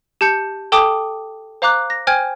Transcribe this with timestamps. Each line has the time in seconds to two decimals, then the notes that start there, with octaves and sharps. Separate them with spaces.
0.21 G4 A5 G6 C#7
0.72 A4 G5 A5 D6 D#6
1.62 C5 F5 A#5 D6 F#6
1.90 A#6
2.07 C5 G5 G#5 F6 G#6